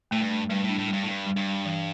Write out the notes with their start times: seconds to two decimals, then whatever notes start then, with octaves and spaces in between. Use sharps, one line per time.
0.11 A2 A3
0.21 G2
0.31 A3
0.49 G2 G3
0.64 A2 D4
0.79 A2
0.88 G3
0.93 G2
1.03 A2
1.08 G2 G3
1.26 G3
1.37 G2
1.47 G3
1.65 E3